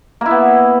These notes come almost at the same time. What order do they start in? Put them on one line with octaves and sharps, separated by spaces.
A#3 E4 B3